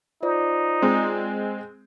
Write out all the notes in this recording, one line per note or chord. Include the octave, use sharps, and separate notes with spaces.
D#4 F4 C5 D5
G#3 C4